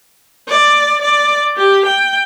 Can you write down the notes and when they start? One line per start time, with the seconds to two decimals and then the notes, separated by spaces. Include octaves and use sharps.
0.49 D5
1.01 D5
1.56 G4
1.86 G5